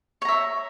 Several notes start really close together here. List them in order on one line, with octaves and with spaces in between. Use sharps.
C#5 A#5 E5